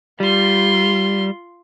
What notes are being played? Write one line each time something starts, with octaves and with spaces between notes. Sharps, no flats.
G3 F4 C6